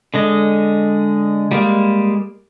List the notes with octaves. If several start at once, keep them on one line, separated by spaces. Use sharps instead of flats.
D3 G#3 D#5
G3 G#3 A#3